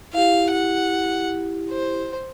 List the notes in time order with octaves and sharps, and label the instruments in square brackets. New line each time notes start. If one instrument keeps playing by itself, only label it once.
[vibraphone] E4 G4 [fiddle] F5
[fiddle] F#5
C5